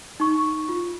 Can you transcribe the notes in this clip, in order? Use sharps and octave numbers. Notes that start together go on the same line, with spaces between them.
D#4 C#6
F4